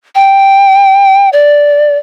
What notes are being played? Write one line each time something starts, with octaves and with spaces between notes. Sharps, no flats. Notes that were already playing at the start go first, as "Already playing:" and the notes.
G5
D5